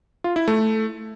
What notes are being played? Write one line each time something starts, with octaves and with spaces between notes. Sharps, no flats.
F4
E4
A3